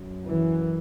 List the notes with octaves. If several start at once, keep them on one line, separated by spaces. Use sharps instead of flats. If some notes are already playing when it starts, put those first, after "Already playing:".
Already playing: F#2
E3